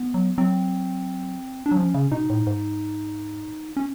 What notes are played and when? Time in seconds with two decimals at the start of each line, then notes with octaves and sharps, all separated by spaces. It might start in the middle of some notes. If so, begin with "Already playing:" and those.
Already playing: B3
0.14 F#3
0.38 F#3 C4
1.66 D4
1.71 F#3
1.77 F3 C#4
1.94 C#3
2.12 B2 D#4
2.30 A2
2.47 G#2
3.76 C#4